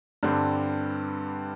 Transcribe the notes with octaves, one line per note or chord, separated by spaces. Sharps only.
G2 D3 G3 C4